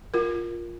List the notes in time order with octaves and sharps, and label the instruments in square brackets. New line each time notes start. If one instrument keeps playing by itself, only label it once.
[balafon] F4 A#4